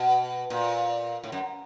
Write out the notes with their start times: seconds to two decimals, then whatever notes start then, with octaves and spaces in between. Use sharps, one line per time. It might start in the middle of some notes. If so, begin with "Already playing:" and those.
Already playing: B2
0.50 A#2
1.23 A2
1.32 F#2